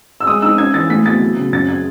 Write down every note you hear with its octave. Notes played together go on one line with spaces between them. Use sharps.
E6
G#3 D#6
D#4 E6
C#4 G#6
E3 A6
A3 B6
B2 A6
F#3
C#3
F#2 A6
G#6